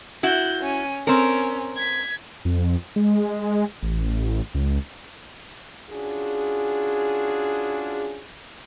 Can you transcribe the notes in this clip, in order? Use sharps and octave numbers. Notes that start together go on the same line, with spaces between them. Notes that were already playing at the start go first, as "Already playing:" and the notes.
E4 F#4 F#6 G6
C#4 D#7
C4 C#4 A#4
G#6 B6
F2
G#3
A1
C#2
C#4 D4 F4 F#4 G#4